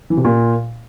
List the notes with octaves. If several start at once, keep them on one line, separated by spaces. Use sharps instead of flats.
E3
C3
A#2